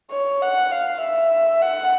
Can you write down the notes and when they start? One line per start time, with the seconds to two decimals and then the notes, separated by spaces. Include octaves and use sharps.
0.11 C#5
0.42 F#5
0.71 F5
1.01 E5
1.62 F#5